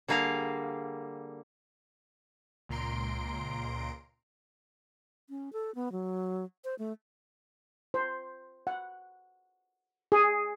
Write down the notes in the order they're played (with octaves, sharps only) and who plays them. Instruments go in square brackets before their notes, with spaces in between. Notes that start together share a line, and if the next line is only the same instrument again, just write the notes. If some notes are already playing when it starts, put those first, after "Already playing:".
[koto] D3 G3 A#3 G#4 F5
[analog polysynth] C#2 A#2 A#5 C6 D7
[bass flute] C#4
A4
B3
F#3
C5
A3
[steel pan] C5
F#5
G#4